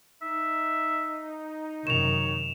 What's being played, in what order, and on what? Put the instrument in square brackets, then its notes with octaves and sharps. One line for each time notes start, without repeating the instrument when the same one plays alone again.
[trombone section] D#4 [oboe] E5
[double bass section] F#2 C3 D#3 [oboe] C#5 [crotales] E7 F7